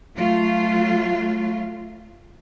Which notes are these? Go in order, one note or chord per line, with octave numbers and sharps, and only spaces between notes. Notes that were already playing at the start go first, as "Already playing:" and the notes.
F#3 A3 F4